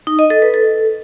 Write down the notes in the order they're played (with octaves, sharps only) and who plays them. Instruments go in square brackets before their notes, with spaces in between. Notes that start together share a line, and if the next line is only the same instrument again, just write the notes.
[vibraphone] D#4
D#5
A4
B4
A4